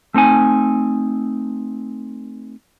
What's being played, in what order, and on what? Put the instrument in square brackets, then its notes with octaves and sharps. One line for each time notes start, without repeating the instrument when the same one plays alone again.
[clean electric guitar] A3 C4 D#4 G#5